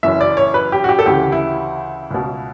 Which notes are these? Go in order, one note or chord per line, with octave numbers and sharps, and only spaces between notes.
F#1 F#2 E3 E5
D5
C#5
B4
G4
F#4
G4
A4
D2 C#3 E3 G4
E4
C#2 B2